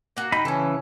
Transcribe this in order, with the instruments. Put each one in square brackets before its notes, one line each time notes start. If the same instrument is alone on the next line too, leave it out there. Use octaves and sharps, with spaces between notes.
[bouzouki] A#3 F#4
[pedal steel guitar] D#4 B5 [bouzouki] G5
[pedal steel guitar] C#3 E3 [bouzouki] C#4 A4